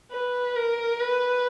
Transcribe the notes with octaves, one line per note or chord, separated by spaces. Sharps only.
B4
A#4
B4